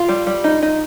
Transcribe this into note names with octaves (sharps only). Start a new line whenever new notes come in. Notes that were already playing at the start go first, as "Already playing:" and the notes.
Already playing: F4
G3
G3
D#4
D#4